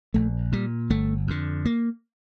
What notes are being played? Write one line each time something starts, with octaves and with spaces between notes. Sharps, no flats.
A#1 A3
A#2 G3
G1 A3
F2 D3
A#3